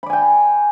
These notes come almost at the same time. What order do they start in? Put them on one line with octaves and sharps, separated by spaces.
B5 D5 G#5 G5